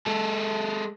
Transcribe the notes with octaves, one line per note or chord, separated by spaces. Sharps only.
G#3 A4